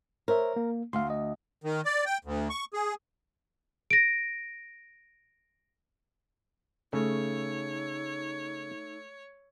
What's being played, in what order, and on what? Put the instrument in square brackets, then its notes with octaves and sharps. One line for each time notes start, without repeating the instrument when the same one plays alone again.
[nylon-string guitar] A#4 [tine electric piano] C5 C#5 E5
[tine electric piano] A#3
[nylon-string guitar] D2 [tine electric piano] F5 C6
[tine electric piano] D#5
[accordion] D#3
D5
G5
D2
C#6
G#4
[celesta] A#6 D7
[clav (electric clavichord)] C#3 [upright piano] A3 [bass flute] D#4 [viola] C#5